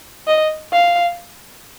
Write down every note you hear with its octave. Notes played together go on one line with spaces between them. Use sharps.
D#5
F5